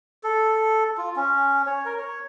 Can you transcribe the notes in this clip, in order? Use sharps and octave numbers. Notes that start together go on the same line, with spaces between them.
A4
F4
C#4
C#5
A#4
C#5